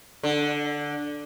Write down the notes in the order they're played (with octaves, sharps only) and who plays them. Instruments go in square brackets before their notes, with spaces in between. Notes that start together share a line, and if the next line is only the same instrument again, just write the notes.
[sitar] D3